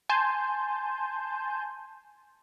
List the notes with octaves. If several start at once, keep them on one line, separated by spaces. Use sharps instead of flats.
G#5 A5 C6 G6